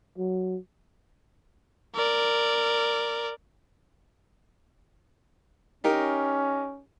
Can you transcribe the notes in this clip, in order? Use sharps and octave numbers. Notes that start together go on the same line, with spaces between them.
F#3
A#4 D5
C#4 D#4 G4 A#4